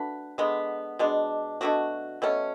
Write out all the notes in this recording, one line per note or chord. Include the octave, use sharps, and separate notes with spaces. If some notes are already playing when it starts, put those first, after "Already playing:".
Already playing: A3 D4 F#4 B4
D3 G#3 B3
B2 G#3 D4
B2 A3 D4 F#4
B2 A3 C#4